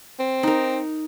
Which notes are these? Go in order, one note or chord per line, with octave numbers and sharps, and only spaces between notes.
C4
D#4 A#4